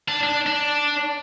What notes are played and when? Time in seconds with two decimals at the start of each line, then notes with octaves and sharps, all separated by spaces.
0.08 D4
0.23 D4
0.47 D4